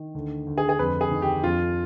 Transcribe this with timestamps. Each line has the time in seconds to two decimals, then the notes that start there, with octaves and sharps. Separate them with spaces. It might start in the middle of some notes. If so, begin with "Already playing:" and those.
Already playing: D#3
0.15 D2
0.47 D2
0.58 G#4
0.69 G#4
0.79 F2 B4
1.01 G#4
1.11 D#3
1.22 G4
1.44 F2 F4